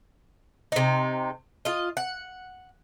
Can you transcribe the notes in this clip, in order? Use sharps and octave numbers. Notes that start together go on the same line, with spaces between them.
C3 D#4
F4 D#5
F#5